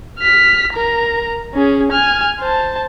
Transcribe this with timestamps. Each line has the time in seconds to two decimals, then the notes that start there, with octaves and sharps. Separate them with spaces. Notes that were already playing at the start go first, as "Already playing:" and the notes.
0.19 F6 B6
0.73 A#4 A#5
1.54 C#4 G#4
1.91 G#5 F6
2.40 C5 A5